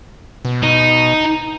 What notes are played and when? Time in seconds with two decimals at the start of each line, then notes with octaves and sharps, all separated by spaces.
0.45 B2
0.63 D#4